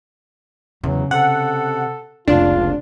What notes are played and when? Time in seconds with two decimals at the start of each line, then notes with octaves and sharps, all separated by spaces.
0.84 E2 C#3 F#3
1.11 C3 A4 F#5
2.28 F1 C#2 D4 F4